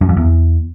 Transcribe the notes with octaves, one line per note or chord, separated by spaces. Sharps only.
F#2
F2
E2